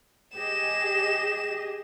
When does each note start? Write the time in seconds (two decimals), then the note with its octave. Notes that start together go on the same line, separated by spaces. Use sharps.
0.36 G4 G#4 D#5 E7